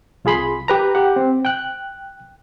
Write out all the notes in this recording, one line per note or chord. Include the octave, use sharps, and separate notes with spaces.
C2 F4 G#4 B5 C6
G4 B4 A#5
G4 F#5
C4
G5 F#6